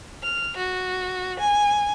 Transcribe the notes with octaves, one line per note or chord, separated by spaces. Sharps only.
F6
F#4
G#5